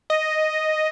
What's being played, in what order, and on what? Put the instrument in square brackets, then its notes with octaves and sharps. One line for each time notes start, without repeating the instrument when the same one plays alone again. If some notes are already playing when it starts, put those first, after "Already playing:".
[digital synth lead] D#5